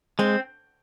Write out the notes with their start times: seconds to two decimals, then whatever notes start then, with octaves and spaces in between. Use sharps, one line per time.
0.19 G#3 C4